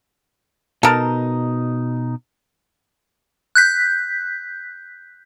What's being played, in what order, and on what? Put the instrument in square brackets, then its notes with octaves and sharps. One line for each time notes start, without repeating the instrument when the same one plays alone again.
[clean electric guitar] B2 D#4 [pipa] A4 A#4
[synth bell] F#6 G6 B6